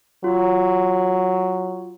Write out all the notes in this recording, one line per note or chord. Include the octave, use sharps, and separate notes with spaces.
F#3 F4